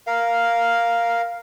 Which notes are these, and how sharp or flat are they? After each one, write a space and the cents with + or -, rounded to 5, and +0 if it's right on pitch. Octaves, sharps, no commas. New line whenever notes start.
A#4 +0 F5 +0